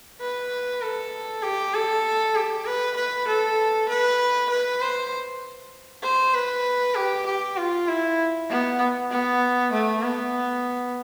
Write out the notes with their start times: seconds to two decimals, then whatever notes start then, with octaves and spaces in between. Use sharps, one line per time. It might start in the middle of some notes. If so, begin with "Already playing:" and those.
0.21 B4
0.82 A4
1.43 G4
1.74 A4
2.35 G4
2.66 B4
2.97 B4
3.28 A4
3.89 B4
4.50 B4
4.81 C5
6.03 C5
6.34 B4
6.96 G4
7.26 G4
7.57 F4
7.88 E4
8.50 B3
9.11 B3
9.73 A3
10.03 B3